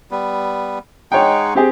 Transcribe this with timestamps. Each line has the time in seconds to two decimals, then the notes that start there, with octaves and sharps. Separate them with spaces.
0.11 G3 B3
1.12 G#3 D#4 C#5 F#5 G5
1.55 C4 G4 G#4